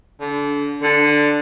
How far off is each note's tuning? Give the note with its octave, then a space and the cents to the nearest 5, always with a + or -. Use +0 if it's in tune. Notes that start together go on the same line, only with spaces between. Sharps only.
D3 -30
D3 +5